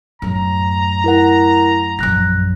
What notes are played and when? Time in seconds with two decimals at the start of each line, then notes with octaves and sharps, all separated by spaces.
0.22 F#2 A2 A#5
1.04 E4 A#4 F#5
1.99 A#1 F#2 F#6 A#6